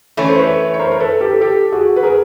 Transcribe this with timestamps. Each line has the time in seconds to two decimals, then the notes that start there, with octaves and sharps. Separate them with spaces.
0.17 E3 A3 C#4 C#5
0.29 C5
0.39 B4 C#5
0.74 C#5
0.79 A#4 C5
0.91 A#4
1.00 A4 B4
1.21 G4 A4
1.41 G4 A4
1.72 F#4 G#4
1.96 B4
2.03 G#4 A#4